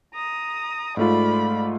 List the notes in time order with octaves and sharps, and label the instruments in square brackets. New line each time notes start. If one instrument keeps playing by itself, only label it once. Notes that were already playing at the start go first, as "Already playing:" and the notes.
[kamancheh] A#5 D#6
[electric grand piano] G#2 A3 F4 [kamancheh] D5 B5